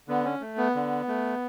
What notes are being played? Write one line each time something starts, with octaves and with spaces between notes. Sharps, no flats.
D3 B3
C#4
A3
B3
D3
A3